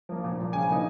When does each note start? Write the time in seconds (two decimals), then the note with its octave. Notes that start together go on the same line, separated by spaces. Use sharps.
0.09 F3 A#3
0.24 A#2
0.38 F3 A#3
0.53 C#3 G#5
0.68 F3 A#3 D#4